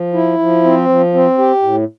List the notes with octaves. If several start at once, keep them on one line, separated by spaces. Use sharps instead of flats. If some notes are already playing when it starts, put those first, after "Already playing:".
Already playing: F3
E4
F3
C4
F3
C4
G4
A2